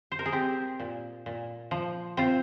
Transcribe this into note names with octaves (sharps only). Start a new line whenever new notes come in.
C5
A#4
G#4
C4 G4
A#2
A#2
F3
C4 F4